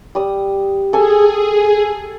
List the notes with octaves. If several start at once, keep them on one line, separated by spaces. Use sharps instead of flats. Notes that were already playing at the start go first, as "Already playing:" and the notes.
G3 D#6
G#4 A4 G#5